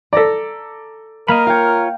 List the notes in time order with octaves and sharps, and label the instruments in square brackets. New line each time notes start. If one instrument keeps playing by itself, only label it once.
[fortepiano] A4 D5 [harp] A#5 A#6 B6
[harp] A#3 [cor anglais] A#4 [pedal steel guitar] D#5 F5 B5
[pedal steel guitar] F4 C#5 [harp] F5 G5